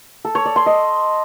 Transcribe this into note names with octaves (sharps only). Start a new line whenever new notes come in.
A4
C#5
D5
C6
D#5